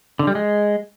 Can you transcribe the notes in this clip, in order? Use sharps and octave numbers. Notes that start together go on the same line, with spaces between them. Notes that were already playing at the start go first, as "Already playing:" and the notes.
D3
G3
G#3